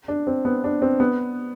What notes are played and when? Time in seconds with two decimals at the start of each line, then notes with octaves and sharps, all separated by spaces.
0.08 D4
0.27 C4
0.45 B3
0.64 D4
0.82 C4
1.00 B3